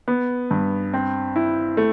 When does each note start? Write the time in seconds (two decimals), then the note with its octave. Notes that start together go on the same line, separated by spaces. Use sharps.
0.08 B3
0.51 G2
0.94 C4
1.36 E4
1.77 A3